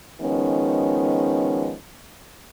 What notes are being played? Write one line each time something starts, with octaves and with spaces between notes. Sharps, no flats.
D#3 F3 G#3 B3 C#4